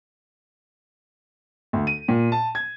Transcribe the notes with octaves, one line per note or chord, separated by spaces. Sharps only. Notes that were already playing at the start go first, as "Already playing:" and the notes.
D2
D#7
A#2
A5
G#6